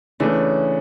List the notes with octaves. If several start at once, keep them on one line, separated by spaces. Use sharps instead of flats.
C#3 E3 A3 D4